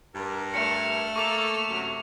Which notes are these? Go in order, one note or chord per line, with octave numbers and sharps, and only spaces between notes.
G2 A#4
A3 F6 C#7
A#3 A4 C#6 D6 F7
F#2 C3 F#3